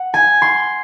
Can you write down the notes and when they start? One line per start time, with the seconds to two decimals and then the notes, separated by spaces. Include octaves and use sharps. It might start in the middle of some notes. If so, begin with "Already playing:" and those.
Already playing: F#5
0.14 G#5
0.42 C6